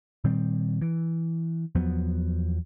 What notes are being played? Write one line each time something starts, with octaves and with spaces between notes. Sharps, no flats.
A#2 D#3 G3 C4
E3
E2 F3 F#3 B3